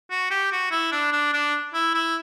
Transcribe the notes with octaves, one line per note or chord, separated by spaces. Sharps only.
F#4
G4
F#4
E4
D4
D4
D4
E4
E4